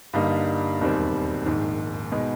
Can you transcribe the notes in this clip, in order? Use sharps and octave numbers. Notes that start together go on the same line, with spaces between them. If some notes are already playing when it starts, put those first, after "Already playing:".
G2 D3 G3 A#3 D#4
E1 D#2 D#3 G3 C4
A#1 G#2 D#3
B2 G#3 B3 D#4